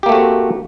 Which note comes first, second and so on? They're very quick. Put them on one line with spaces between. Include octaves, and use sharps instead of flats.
G4 A#3 A3 F#4 C4